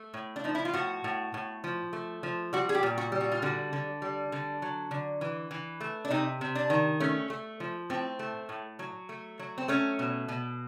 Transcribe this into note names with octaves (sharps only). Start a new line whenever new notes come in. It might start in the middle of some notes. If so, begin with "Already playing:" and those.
Already playing: A3
A2
D4
F3 D#4
E4
F4
A2 F#4
A2
A2
F3
A3
F3
G3 F#4
G#4
G4
A#2
F#4
G3
F#4
F4
D3 F#4
D3
G3
D3
F#3
D3
E3
E3
A3
D4
C3 D#4
C3
D4
D#3
A3 C#4
A3
F3
A2 C4
A3
A2
F#3
A3
F#3
C4
A3 C#4
B2
B2